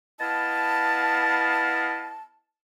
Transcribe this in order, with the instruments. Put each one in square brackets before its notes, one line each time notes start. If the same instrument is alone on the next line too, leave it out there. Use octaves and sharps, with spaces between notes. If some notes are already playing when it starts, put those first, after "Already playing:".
[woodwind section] B3 E4 D#5 F5 A5